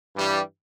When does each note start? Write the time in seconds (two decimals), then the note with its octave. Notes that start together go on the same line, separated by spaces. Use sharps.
0.16 G2 E3 G3